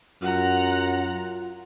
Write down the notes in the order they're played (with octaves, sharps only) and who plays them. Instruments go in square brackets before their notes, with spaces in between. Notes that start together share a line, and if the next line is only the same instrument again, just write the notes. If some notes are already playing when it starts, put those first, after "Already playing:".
[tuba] F#2 [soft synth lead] F4 [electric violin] F#5 A#5